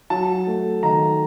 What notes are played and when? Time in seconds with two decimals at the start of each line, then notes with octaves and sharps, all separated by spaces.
0.10 F#3 A5
0.47 A3
0.83 D#3 A#5